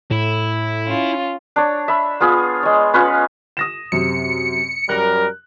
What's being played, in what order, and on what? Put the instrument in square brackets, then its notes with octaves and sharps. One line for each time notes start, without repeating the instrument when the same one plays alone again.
[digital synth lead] A2 [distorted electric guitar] E4
[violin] C#4 F4
[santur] D4 C#5
E5 B5
B3 F4 G#4
G#3 C#5
C#4 F4 B4 C#5
[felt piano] D#6 A#6 E7
[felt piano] F#2 C3 [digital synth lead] C#7
[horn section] F#2 G3 A#4 [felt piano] F#6